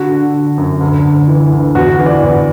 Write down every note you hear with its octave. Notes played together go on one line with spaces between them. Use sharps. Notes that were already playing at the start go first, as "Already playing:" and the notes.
Already playing: D3 F#4
D3
D3
F#2
D2
D2
E3
D2
E2 F#4
E3
D5
E2